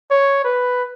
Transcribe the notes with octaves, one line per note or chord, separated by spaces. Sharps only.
C#5
B4